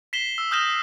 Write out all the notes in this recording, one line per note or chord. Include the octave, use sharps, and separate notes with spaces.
B6 C7 E7 G7
E6
D#6 F6 G6 A#6 E7 G7